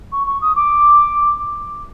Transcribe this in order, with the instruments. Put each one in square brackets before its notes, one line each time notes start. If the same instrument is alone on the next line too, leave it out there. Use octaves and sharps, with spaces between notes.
[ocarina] C#6
C#6
D#6
D6